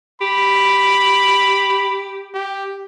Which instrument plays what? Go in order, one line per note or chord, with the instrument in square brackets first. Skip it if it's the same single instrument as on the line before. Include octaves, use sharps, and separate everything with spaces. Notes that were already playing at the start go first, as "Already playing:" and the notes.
[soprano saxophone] G4 [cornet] B5
[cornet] G4